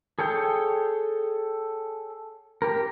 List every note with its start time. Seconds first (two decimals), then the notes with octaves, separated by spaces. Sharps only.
0.19 G#4 A4 C#5 G5
2.62 G4 A#4